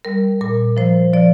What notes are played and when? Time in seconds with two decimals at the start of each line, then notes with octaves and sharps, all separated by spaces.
0.05 G3 A#4
0.41 A#2 A#4
0.77 F3 C5
1.13 F3 D5